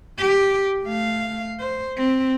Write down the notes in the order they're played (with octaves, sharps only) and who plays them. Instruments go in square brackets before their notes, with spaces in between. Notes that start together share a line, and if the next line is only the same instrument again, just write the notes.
[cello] G4
A3 F5
C5
C4